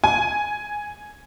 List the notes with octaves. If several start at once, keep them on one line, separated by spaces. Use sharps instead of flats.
G#5